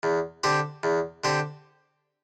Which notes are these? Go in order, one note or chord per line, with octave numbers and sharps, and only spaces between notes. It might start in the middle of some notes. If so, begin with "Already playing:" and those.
E2
D3 C4 G4
E2
D3 C4 G4